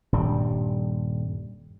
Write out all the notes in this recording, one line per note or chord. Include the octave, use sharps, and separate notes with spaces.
D#1 G2 G3